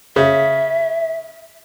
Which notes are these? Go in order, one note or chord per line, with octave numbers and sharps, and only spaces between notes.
C#3 E5